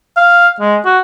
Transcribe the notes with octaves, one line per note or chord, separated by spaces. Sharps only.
F5
G#3
F#4